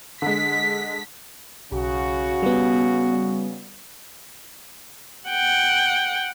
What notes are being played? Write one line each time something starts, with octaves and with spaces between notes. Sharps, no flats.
D3 G#3 B6
B1 C#3 F#4
G3 B3
F#5 G5